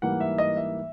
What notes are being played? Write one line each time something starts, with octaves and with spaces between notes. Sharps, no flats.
G#2 E3 G3 A#3 F#5
E5
D#5
E5